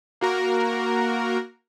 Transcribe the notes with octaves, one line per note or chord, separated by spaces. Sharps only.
A#3 F#4 A#4